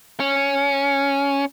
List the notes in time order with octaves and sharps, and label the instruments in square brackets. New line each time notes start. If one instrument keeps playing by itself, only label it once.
[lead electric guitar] C#4